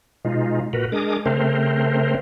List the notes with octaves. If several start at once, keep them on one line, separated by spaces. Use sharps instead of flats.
B2 G#3 D#4 F4
A#2 F#4 A#4 B4
G#3 D4 G#4 A#4 D6 D#6
C#3 A3 C4 A#4 C5